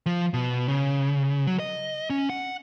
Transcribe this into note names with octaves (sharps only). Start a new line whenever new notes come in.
F3
B2
C#3
F#3
D#5
C#4
F#5